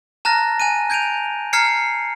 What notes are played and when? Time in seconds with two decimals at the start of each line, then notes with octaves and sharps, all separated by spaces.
0.25 A5 A#5 F6 F#6 A6 A#6
0.60 G#5 F#6 D#7
0.90 G6 G#6 D7 D#7 F7
1.53 A#5 F6 G#6 C7 C#7